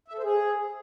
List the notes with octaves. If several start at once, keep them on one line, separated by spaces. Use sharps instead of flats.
E5
A4
C5
G#4